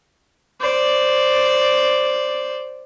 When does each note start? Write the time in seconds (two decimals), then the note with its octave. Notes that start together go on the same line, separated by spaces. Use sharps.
0.61 C5 D5